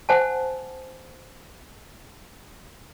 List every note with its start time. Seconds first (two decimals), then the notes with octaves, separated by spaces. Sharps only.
0.09 C5 F#5 G#5 A5